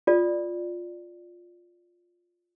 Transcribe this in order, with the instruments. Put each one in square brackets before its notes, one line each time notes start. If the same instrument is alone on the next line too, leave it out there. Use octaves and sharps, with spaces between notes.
[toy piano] F4 A4 D5